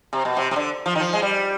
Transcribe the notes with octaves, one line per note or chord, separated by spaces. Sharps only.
C3
B2
C3
C3
D3
F3
D#3
F3
G#3
G3